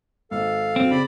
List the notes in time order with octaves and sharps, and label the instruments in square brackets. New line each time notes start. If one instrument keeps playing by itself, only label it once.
[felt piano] G#1 [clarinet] A4 [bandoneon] F5
[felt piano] F#2 E6 [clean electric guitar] C4
[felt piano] C#3 [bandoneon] D5 B5